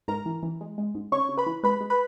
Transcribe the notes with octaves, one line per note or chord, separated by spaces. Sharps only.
G#2 A#4 A#5
E3
E3
G#3
G#3
G#2
C#3 C#5 C#6
C#3
B4 B5
E3
G#3 B4 B5
G#3
B4 B5